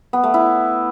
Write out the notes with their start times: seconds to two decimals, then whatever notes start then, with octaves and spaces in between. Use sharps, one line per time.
0.13 B3
0.24 A3
0.34 E4